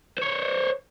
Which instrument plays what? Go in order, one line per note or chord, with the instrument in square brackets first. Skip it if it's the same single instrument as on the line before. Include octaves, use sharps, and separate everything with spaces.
[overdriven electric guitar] C5 C#5